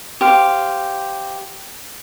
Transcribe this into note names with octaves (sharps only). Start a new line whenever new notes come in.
G4 C5 F5